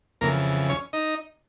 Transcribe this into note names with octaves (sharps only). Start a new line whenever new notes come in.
F2 C#3 E3 A#3 A#4
C#4 C#5
D#4 D#5